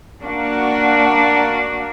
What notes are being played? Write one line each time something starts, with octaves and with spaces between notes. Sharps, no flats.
A#3 D4 F#4